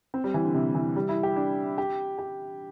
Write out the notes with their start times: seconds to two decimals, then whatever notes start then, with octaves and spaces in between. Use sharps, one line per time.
0.14 C4
0.24 G3
0.34 E3
0.45 D3
0.54 C3
0.75 E3
0.96 G3
1.09 E4
1.23 G4
1.36 D4
1.78 G4
2.18 G4